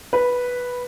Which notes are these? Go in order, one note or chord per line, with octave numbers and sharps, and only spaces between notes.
B4